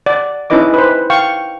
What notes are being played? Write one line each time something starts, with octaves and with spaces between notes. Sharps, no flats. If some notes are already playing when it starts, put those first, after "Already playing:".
D5 F#5
C#4 D#4 E4 B4 D#5 D6
B4 C5
F5 G5 C#6